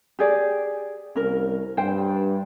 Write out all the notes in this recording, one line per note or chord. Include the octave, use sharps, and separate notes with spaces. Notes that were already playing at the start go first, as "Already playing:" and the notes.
G4 G#4 D5
C2 C#4 A#4
G2 C5 G5